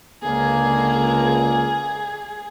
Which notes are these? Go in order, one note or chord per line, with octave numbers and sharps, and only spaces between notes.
C#2 D3 A#3 G#4